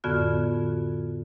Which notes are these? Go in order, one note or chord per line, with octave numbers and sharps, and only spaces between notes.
F2 A2 D3 B3 F#4 F6